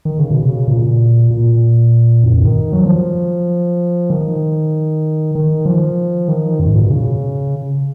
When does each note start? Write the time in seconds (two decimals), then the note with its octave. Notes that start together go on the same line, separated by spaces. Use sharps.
0.05 D#3
0.19 C#3
0.31 B2
0.44 C#3
0.68 A#2
1.31 A#2
2.24 F#2
2.34 F2
2.44 D#3
2.72 F#3
2.86 F3
4.10 D#3
5.35 D#3
5.66 F3
6.28 D#3
6.59 F#2
6.66 G#2
6.75 A#2
6.82 B2
6.90 C#3